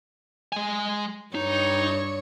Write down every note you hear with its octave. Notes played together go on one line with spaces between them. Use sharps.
G#3 G#5
G2 D#4 C#5